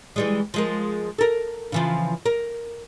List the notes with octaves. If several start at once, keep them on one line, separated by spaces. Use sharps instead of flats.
E3 G3 G#3
F3 G#3 A#4
A4 A#4
C#3 E3 F3
A#4